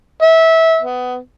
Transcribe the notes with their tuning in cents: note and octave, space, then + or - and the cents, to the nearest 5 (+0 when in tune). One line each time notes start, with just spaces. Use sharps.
E5 -20
B3 +20